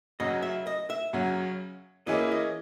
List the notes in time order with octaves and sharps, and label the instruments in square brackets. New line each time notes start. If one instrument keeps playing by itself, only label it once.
[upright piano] F#2 C#3 F#3 C#4 F#4 [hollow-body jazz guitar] D#5
[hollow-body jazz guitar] E5
D#5
E5
[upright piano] F#2 C#3 F#3 C#4 F#4
[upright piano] E3 A#3 C#4 E4 G#4 [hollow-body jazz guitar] D#5
[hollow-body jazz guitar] D#5